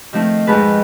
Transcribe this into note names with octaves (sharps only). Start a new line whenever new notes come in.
D#3 F3 A3 C4
F2 G#2 D#3 G#4 B4 A5